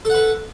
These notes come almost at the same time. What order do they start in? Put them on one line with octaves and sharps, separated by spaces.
A4 F#5 B4